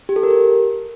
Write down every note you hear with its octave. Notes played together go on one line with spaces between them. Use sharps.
G4
A4
A#4
G4